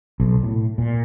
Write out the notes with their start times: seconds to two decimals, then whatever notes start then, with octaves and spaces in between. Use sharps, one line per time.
0.20 B1
0.43 A2
0.78 A#2